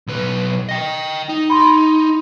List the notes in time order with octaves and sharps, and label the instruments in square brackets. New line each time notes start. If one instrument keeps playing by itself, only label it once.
[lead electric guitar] B1 B4
[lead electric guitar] D#5 G5 [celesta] A#6
[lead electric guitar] D#4
[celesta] B5 C6